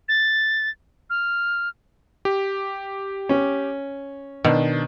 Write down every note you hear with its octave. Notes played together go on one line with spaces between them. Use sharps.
A6
F6
G4
C#4
B2 D#3 D4